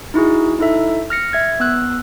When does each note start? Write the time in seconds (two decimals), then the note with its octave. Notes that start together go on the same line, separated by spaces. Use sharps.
0.14 D#4 E4 F#4 G#4
0.59 D#4 E4 A4 E5
1.10 F6 A#6 C#7
1.33 E5 G#6
1.60 B3 E6 F#6